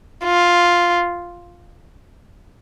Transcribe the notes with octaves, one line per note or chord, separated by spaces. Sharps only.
F4